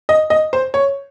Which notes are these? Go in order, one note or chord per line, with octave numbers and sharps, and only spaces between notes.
D#5
D#5
C5
C#5